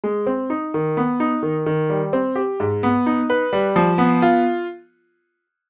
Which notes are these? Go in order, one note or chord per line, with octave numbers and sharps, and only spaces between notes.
G#3
C4
D#4
D#3
B3
D#4
D#3
D#3
G3
C4
G4
G#2
B3
D#4
B4
G3
F3
B3
F4